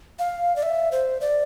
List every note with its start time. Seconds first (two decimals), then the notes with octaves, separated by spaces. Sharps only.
0.19 F5
0.56 D5
0.63 E5
0.92 C5
1.21 D5